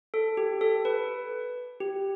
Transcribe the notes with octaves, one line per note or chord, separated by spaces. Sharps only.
A4
G4
A4
B4
G4